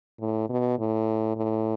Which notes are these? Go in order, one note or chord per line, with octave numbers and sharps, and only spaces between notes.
A2
B2
A2
A2